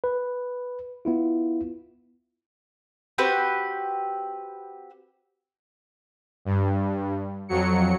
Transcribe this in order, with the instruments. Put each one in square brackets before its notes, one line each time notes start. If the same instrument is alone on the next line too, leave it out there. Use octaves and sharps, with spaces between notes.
[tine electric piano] B4
B3 E4 F4
[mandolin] C4 F#4 G4 B4
[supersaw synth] G2
F2 F#3 C#7